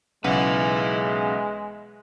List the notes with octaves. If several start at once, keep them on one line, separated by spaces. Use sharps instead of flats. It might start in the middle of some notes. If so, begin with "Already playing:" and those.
B1 C#3 G#3 B4 E5 F#5